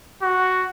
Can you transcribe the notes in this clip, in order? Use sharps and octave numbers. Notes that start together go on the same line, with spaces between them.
F#4